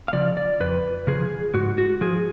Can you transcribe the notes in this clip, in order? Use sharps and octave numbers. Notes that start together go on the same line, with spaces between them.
F5
C#3 F3 D5
D5
F2 B4
C#3 F3 G#4
G#2 F#4
F#4
F3 G#4